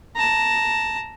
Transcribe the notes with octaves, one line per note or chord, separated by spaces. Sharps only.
A5 A#5